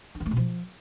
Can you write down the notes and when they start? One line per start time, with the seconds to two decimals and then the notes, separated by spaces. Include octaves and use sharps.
0.15 D4
0.20 D#3
0.26 A3
0.31 B2
0.37 F3